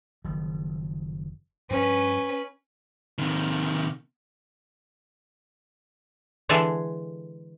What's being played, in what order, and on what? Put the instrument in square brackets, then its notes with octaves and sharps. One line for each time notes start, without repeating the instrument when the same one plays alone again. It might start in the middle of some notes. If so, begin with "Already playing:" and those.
[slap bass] F#1 D#3 F3
[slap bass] G2 F3 D4 [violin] C#4 B4
[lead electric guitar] C3 D#3
[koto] D3 E3 G#3 G#4 A4